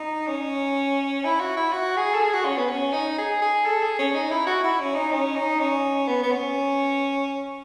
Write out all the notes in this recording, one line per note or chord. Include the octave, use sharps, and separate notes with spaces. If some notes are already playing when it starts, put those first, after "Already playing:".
Already playing: D#4
C#4
E4
F#4
E4
F#4
G#4
A4
G#4
F#4
C#4
B3
C#4
D#4
G#4
G#4
A4
G#4
C#4
D#4
E4
F#4
E4
C#4
D#4
C#4
D#4
C#4
B3
B3
C#4